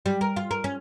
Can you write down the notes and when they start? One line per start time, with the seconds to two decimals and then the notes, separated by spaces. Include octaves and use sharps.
0.06 G3
0.21 A#4
0.36 F4
0.51 A#4
0.64 C#4